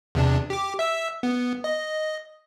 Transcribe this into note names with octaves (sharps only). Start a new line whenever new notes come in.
E2 C3 D4
G4 D6
E5 E6
B3
D#5